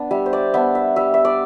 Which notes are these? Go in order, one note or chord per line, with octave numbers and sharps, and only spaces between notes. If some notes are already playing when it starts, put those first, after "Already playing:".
Already playing: B3 D4
G3 E5
C5
D5
B3 D4 E5
E5
G3 E5
E5
D5